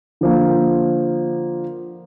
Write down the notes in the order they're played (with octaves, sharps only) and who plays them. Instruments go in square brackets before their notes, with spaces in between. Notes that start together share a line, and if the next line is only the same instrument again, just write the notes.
[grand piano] D3 F3 A#3